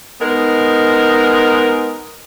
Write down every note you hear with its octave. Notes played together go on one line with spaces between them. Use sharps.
G#3 B3 D#4 A#4